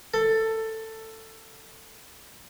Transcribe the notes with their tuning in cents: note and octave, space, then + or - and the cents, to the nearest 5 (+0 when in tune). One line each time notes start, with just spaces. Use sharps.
A4 +15